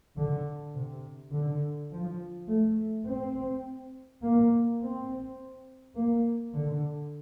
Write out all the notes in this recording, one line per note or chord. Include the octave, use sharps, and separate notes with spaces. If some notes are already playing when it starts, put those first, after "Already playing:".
D3
C3
D3
F3
A3
C4
A#3
C4
A#3
D3